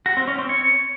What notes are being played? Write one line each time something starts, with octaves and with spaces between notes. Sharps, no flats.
F#4
C4
C#4
C4
C#5